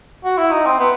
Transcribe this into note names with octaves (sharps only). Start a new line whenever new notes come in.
F#4
E4
D#4
C4
B3